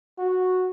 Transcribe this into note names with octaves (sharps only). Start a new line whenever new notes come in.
F#4